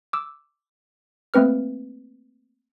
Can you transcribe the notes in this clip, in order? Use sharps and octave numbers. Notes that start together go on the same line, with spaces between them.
D6 E6
A3 A#3 C4 B4 F6